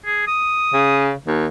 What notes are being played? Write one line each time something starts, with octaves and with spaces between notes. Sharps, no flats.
G#4
D#6
C#3
D#2